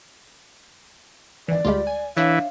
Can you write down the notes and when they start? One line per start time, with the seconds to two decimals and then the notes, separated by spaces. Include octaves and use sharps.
1.48 G#1 E3 D5
1.65 D2 G3 G#3 F4 G4 B5
1.87 G#5
2.17 E3 D4 C#5 E5 F5